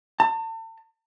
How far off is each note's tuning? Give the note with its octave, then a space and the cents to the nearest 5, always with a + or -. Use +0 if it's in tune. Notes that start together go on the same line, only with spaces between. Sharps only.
A5 +40